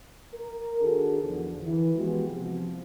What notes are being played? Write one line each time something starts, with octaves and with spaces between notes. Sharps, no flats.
A#4
D#3 D4 F#4 G#4 A4
E2 D3 F3
E3
F3 G#3 B3 F#4 G4
C3 F3